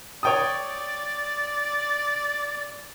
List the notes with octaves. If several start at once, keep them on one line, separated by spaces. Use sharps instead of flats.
C#5 D5 G5 D#6